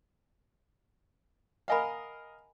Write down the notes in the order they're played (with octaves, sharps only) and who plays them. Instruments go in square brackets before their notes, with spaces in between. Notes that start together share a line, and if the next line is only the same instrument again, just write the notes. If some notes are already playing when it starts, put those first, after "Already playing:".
[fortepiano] A#4 D#5 F5 [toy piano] F#5 G#5 B5